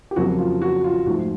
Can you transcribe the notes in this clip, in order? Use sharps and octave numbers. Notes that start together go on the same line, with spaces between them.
G4
F2 C#3 F#3 A#3 F#4
F4
F#4
F4
G#2 F3 A3 F#4